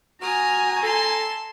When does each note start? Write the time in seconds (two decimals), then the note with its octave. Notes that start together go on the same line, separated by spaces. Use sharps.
0.21 F#4 G#5 A#5 D#6 F6
0.83 A4 A5 C6